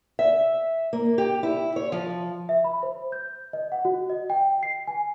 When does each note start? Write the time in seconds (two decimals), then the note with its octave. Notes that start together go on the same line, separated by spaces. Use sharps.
0.19 E5
0.93 A#3
1.18 G4
1.43 E4
1.76 C#5
1.92 F3
2.49 E5
2.64 B5
2.83 C5
3.12 G6
3.53 D#5
3.72 F#5
3.85 F#4
4.10 D#5
4.30 G5
4.63 C7
4.87 G#5